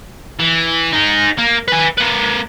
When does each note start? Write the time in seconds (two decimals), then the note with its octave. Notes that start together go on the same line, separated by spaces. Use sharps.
0.39 E3
0.93 D#4 G#4
1.38 A#3
1.68 B4 G#5
1.98 A#3 B4